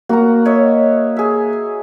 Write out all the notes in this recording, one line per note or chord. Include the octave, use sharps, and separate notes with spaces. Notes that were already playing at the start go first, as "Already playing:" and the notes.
A#3 F#4 A#5
C#5 D#5 E5
G#4 E5